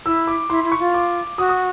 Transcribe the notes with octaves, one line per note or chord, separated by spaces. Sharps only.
E4 E6
D6
E4 C6
E4
C#6
F4
D6
F#4 D#6
D#6